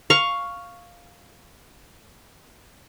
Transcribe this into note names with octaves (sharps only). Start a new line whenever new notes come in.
F5 C#6